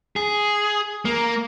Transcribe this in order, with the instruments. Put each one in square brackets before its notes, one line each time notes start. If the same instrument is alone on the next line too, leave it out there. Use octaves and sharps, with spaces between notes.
[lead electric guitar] G#4
A#3